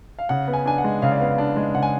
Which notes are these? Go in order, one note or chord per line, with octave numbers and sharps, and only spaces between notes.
F5
C#3 F#5
B3
G#5
D4 G#5
F#5
G#3
C#3 F5
D5
B3 F5
D4
G#3
C#3 F#5
G#5